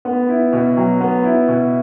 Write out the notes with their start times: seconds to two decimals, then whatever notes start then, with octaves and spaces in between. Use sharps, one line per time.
0.05 B3
0.29 E4
0.53 B2
0.77 F#3
1.01 B3
1.23 E4
1.48 B2